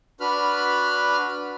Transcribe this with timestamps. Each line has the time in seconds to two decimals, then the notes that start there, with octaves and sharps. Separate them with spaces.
0.20 D4 F#4 B4 B5 F6